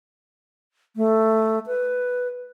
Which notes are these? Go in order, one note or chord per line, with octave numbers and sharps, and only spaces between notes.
A3
B4